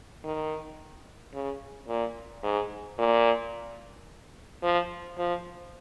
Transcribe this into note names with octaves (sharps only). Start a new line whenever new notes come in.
D#3
C#3
A#2
G#2
A#2
F3
F3